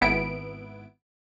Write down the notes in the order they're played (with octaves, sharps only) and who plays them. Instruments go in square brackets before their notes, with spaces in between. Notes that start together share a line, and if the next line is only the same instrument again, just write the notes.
[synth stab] G#1 B3 E4 D7